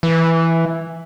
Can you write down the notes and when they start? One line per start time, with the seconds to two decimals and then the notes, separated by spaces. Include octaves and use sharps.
0.03 E3